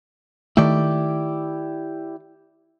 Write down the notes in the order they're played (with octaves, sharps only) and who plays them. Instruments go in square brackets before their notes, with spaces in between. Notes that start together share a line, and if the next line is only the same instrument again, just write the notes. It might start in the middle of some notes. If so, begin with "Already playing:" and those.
[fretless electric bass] D#3 A3 [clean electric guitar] E4 G4 D5